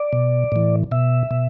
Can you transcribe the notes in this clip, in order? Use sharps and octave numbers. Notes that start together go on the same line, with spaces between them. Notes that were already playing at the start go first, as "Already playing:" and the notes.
Already playing: D5
B2
A2 E3
B2 E5
B2